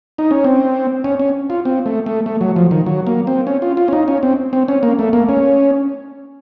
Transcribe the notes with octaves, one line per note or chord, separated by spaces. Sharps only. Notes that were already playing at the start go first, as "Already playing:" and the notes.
D#4
C#4
C4
C#4
C#4
F4
C4
A3
A3
A3
F#3
F3
D#3
F#3
A#3
C4
C#4
F4
F4
C#4
D#4
C#4
C4
C4
C#4
A#3
A3
A#3
C#4